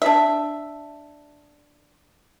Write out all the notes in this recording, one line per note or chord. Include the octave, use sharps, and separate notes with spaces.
D4 E5